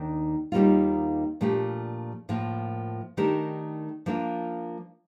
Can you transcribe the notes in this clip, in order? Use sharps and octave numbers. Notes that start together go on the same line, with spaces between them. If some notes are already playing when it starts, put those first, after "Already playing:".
Already playing: D#2 D#3 D4
D#2 D#3 G3 A#3 F4
A#2 F3 A3 D4 G4
A2 F3 A#3 F4
D#3 A3 D4 G4 A#4
F3 A#3 D4 F4